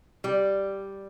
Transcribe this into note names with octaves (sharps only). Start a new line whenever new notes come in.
G3